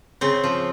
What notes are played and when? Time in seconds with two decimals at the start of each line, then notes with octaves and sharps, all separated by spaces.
0.21 C#3 C4
0.44 F3